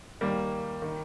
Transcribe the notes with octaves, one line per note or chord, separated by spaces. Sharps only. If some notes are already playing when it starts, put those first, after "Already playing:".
D#2 D#3 G3 A#3
D#3